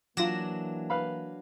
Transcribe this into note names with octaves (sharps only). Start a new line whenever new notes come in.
E3 F#3 A#3 D4 F4 A#6 E7
B4 F5 B5